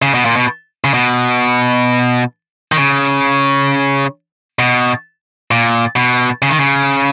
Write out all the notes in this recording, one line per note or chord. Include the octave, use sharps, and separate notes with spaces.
C#3
B2
A#2
B2
C#3
B2
D#3
C#3
B2
A#2
B2
C#3
D#3
C#3